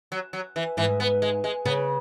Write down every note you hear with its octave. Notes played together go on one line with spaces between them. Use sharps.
F#3
F#3
E3
G#2 E3
B3
G#3
G#3
C#3 B3